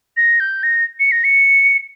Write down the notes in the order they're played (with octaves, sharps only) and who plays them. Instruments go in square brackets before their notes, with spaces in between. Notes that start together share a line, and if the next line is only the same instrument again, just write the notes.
[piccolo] A#6
G6
A#6
C#7
A#6
C#7